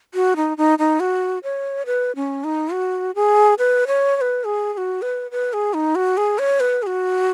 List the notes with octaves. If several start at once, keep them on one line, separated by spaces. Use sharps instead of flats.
F#4
D#4
D#4
D#4
F#4
C#5
B4
C#4
D#4
F#4
G#4
B4
C#5
C#5
B4
G#4
G#4
F#4
B4
B4
G#4
D#4
F#4
G#4
C#5
B4
G#4
F#4